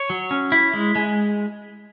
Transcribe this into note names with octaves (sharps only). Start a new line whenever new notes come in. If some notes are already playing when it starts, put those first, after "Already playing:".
Already playing: C#5
F#3
C#4
E4
G#3
G#3